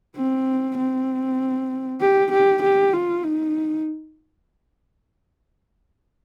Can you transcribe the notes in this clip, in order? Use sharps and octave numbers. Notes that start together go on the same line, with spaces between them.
C4
C4
G4
G4
G4
F4
D#4